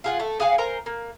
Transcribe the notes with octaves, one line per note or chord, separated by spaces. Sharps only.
F4 G#4 F#5
A3
G#4 F5 F#5 G#5
A#4 C5 G#5 A#5
A#3